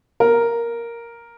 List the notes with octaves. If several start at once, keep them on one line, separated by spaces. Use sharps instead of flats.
A#4